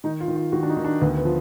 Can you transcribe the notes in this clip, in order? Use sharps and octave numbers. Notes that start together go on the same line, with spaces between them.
D#3 D#4
F4
D#3
F4
D#3 F#4
D4
D#4
D#3
D4
D2 B3
B3
F3